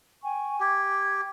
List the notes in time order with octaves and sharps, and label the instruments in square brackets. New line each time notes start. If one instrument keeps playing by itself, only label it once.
[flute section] G5 G#5 C#6
[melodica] G4 [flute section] G#6